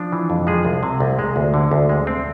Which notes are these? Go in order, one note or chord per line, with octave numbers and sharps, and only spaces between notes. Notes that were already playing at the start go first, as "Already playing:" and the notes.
Already playing: F3 D4 F4
E3
F2
F3 G#3 G#4
C2
C3
C2
G#3
D2
D3
D2
G#3
C4